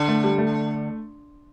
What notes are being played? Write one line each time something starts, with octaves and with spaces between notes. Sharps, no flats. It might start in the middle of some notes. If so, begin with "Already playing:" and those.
Already playing: D3
A3
G3
A3